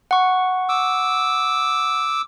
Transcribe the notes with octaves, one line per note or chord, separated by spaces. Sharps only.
F#5 C#6
D6 E6